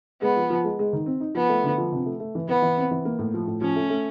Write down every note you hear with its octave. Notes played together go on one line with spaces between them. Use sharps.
G#3 B3
F3
F3
G#3
G#3
D#3
C4
D#4
F3 B3
A3
D3
F3
C3
A3
A3
E3
E3 B3
E3
C4
E3
A#3
A2
F3
A2
F3 C#4
A3
A3